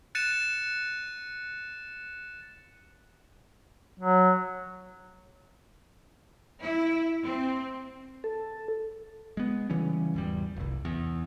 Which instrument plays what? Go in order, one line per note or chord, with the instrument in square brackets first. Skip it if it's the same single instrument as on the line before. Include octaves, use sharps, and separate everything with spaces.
[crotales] F#6 A6 C#7 D#7 E7
[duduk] F#3
[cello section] E4
C4
[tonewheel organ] A4
[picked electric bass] G#3 B3
C#3 E3 G3 C#4
G#1 E2 G3
F1 C2
E2